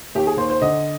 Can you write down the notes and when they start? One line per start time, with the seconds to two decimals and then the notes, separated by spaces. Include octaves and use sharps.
0.15 D#2 G4
0.27 G#4
0.37 D#2 C5
0.50 C5
0.61 D3 D#5